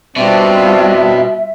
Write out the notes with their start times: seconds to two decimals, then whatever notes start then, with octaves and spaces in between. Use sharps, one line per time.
0.16 B2 G3 C4 D4 F4 E5